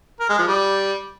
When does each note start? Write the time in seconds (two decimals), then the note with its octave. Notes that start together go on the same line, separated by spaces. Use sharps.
0.20 A#4
0.29 G#3
0.38 F3
0.48 G3